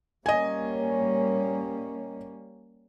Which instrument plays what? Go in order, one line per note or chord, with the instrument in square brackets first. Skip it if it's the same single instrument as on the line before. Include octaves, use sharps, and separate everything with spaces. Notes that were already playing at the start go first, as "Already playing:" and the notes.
[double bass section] G3 A#3 C#4 [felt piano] D#5 G#5